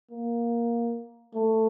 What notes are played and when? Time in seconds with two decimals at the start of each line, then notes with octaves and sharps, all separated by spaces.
0.11 A#3
1.34 A3